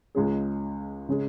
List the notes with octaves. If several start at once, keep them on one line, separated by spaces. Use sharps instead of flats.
C#2 C#3 G#3 C#4 G#4
C#3 G#3 C#4 G#4